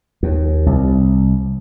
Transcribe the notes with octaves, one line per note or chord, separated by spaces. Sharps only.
D#2
C2